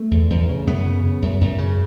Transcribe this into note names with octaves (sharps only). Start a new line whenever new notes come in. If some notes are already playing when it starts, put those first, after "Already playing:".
Already playing: A3
E2
E2
C#3
F#2 B3
C#3
C#3
F#2
F#2
C#3